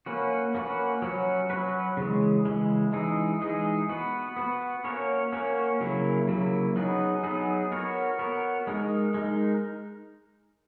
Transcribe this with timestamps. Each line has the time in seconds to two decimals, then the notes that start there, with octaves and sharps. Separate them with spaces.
0.06 A#3 C#4 F#4 B4
0.55 A#3 C#4 F#4 B4
1.02 F#3 C#4 F#4 B4
1.50 F#3 C#4 F#4 B4
1.97 C#3 E3 G#3
2.45 C#3 E3 G#3
2.93 E3 G#3 D#4 G#4
3.41 E3 G#3 D#4 G#4
3.89 B3 F#4 B4
4.37 B3 F#4 B4
4.84 A#3 C#4 F#4 A#4 C#5
5.32 A#3 C#4 F#4 A#4 C#5
5.81 C#3 F#3 A#3 E4
6.27 C#3 F#3 A#3 E4
6.76 F#3 B3 D#4 G#4 B4
7.24 F#3 B3 D#4 G#4 B4
7.72 B3 F#4 A#4 C#5
8.19 B3 F#4 A#4 C#5
8.67 G#3 D#4 A#4
9.14 G#3 D#4 A#4